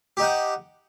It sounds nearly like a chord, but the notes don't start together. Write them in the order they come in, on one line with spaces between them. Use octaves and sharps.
G4 D#4 F#5